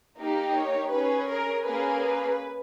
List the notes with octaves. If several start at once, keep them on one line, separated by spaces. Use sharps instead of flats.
A#3 D#4 G4
C#5
C#4 G#4 B4
A#4
A#3 C#4 G#4 B4
B4